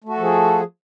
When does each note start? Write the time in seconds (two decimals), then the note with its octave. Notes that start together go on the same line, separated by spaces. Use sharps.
0.04 A3
0.09 F#4
0.13 A4
0.18 F3
0.23 G#4